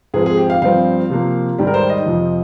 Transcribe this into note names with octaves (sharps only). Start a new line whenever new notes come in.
G#2 F3 C4 G#4
G#4
G4
F5
G2 F3 C4 F5
C3 F3 A#3
G#2 D#3 G3
A#4
C5
D#5
F2 C3 F3